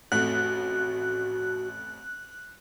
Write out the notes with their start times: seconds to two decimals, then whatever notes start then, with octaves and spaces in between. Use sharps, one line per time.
0.12 A1 F2 A3 F#4 F#6